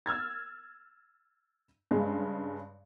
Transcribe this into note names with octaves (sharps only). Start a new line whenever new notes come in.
E6 F6 G#6 A6
G2 C#3 G#3